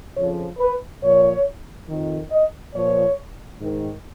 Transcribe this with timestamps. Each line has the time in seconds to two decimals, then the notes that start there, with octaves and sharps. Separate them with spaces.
0.16 F2 C#3 F3 C#5
0.59 B4
1.02 A#2 F3 C#5
1.88 F2 D#3
2.31 D#5
2.74 A#2 F3 C#5
3.60 G#2 D#3